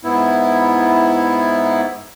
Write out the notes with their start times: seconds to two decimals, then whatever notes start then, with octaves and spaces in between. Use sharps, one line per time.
0.04 G#2 B3 E4